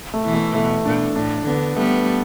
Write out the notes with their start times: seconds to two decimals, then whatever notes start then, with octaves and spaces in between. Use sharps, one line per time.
0.14 A3
0.24 B2 E3
0.34 A3
0.54 B2 A3
0.85 B2 D4
1.15 A2 D4
1.46 D3 B3
1.76 G3 A3 B3